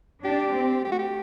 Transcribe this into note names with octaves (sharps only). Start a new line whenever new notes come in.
D4 G4
C4
A3 G4
F#4
G4